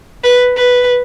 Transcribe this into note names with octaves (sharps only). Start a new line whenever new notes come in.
B4
B4